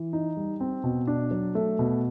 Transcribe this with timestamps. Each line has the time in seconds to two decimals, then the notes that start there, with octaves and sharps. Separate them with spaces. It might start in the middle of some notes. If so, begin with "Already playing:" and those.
Already playing: E3
0.13 D#4
0.37 G3
0.60 C4
0.84 B2
1.07 D4
1.31 F#3
1.55 A3
1.79 B2